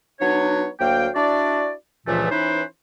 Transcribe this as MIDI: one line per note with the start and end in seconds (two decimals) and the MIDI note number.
0.20 0.67 54
0.20 0.67 59
0.20 0.67 62
0.20 0.67 63
0.20 0.67 73
0.80 1.08 38
0.80 1.08 54
0.80 1.08 58
0.80 1.08 77
0.80 1.08 79
1.15 1.71 62
1.15 1.71 64
1.15 1.71 66
1.15 1.71 74
2.06 2.27 37
2.06 2.27 43
2.06 2.27 46
2.06 2.27 52
2.06 2.27 53
2.06 2.27 57
2.30 2.62 52
2.30 2.62 61
2.30 2.62 63
2.30 2.62 64
2.30 2.62 71
2.30 2.62 72